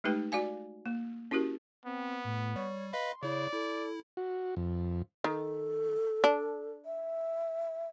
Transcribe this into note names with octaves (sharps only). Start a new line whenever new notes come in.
G#3 A3 D#4 G4 B4 G5
F#4 D5 F5 G#5
A#3
C#4 E4 F#4 G4 A#4
B3 C4
A2
G3 C#5
B4 D#5 F5 B5 C6
C#3 E4 C#5 D5
E4 A4
F#4
F2
D#3 A4
D4
E5